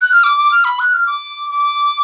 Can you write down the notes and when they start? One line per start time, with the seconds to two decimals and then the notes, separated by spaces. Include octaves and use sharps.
0.02 F#6
0.12 F6
0.24 D6
0.37 D6
0.52 F6
0.65 B5
0.79 F#6
0.94 F6
1.07 D6
1.50 D6